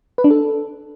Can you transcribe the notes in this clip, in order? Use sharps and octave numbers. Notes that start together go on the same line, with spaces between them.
B4
D4
A4